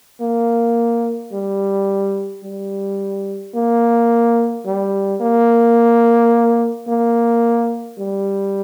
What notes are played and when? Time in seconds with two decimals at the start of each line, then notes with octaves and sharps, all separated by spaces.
0.21 A#3
1.33 G3
2.44 G3
3.55 A#3
4.66 G3
5.21 A#3
6.88 A#3
7.99 G3